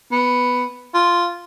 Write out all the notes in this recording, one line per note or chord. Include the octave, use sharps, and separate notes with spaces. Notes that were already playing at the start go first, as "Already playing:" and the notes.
B3
F4